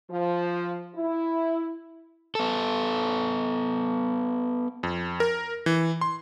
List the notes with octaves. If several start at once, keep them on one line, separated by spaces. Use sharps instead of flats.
F3
E4
B3 A4
F2
A#4
E3
C6